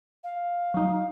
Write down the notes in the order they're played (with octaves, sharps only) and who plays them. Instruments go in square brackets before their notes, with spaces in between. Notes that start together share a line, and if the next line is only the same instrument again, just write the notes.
[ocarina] F5
[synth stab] F#3 D#4